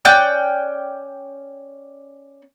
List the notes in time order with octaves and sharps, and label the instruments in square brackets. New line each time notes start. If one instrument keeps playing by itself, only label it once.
[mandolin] C#4 D5 G5 F#6